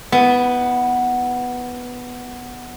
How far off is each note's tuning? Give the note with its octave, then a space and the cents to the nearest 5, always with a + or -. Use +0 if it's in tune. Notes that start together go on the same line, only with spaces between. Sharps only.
B3 +0 E4 -30